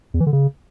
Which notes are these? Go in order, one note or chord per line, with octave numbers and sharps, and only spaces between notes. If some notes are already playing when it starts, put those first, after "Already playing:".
E2
E3
D3
C#3